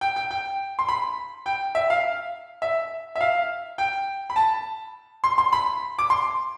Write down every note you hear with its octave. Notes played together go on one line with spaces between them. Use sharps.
G5
G5
G5
C6
B5
G5
E5
F5
E5
E5
F5
G5
B5
A5
C6
C6
B5
D6
C6